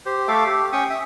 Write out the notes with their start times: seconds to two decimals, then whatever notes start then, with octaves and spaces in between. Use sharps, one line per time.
0.06 G4 C5
0.28 A3 A4 E5 F5 D6
0.46 G4
0.73 C#4 G5 C#6 D#6
0.90 E5